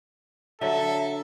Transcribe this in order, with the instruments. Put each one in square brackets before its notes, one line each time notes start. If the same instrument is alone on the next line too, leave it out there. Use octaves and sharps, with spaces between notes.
[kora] D3 F#3 [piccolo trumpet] A4 [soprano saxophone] E5